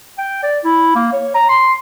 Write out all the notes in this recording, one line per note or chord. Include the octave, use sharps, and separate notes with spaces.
G5
D5
E4
A#3
C#5
A#5
C6